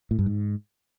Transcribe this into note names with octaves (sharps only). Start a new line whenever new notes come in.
A2
G2
G#2